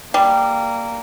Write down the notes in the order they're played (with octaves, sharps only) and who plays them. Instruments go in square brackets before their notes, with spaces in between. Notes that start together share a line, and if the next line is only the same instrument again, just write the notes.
[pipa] G3 [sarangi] A#3